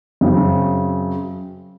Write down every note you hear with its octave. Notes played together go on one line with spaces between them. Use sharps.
F#2 C#3 F#3 C4